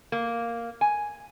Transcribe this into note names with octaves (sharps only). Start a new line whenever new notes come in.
A#3
G#5